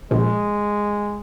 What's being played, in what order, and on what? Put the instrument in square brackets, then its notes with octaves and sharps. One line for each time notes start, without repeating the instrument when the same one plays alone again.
[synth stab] A#1 [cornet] G#3